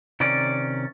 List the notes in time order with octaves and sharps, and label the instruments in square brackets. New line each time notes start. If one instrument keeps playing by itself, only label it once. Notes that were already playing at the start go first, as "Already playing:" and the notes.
[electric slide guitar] C3 D#3 C#4 D5